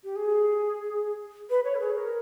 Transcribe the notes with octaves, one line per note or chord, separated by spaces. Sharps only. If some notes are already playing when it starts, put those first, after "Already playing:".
G4
G#4
B4
C#5
A4
G#4
A#4